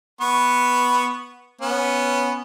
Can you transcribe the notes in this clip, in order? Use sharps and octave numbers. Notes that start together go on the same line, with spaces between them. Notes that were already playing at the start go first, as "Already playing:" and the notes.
B3 B4 C#6
B3 C#4